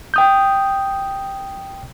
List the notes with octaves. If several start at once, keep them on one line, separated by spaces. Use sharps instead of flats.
G5 D#6 G6